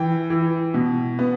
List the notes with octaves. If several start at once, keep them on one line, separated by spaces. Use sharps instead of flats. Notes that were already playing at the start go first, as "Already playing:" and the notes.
Already playing: E3 G5
E3
B2
B3